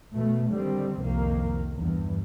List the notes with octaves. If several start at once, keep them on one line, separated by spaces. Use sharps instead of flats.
B2 A3
D3 D#3 G3 C4
C2 F2 D#3 A#3
E2 G2